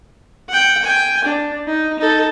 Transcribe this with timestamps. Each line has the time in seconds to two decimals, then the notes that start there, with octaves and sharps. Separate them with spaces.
0.49 F#5 G5
0.85 G5 G#5
1.24 D4
1.66 D#4
1.99 D#4 A4